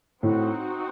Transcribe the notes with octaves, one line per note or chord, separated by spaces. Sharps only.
A2 C4 D#4 F#4